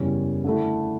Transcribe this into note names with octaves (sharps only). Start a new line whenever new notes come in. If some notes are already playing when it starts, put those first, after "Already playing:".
Already playing: F#1 E2 C#3 G3 C#4
D3 A3 E4